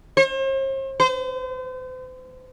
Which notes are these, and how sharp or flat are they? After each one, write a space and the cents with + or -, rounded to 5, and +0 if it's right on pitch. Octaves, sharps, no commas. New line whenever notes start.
C5 +45
C5 -40